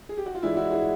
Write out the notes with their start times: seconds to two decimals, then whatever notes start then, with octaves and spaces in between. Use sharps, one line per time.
0.09 G#4
0.18 G4
0.26 F#4
0.35 F4
0.43 G2 E3 G#3 D4 E4
0.57 E4 F#4
0.71 F#4 G#4